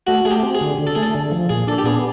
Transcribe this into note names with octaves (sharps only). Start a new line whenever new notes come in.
A3 F#4
A3 G#4
G4
C4
G#4
D3
D3
A4
A3 G#4
A4
D3
F3
A#2 G#4
D4 A4
G4
B3 G#4